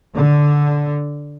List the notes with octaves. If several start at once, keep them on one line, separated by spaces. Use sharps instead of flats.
D3